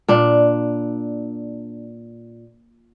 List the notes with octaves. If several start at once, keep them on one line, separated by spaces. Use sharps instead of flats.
A#2 D4